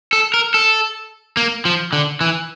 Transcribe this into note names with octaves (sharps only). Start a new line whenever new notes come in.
A4
A#4
A4
A#3
F3
D3
E3